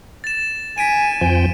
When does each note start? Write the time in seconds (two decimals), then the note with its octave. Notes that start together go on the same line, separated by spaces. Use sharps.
0.24 A6 E7
0.78 G#5 B6 D7 D#7
1.21 F2 F3 G5